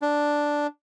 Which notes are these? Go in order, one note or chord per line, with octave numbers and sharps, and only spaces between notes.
D4